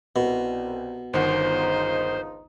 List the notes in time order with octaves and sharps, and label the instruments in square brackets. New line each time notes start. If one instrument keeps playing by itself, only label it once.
[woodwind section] C2 [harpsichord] B2
[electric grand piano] G1 D#3 F#5 [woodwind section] C#2 F3 D#4 [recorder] C5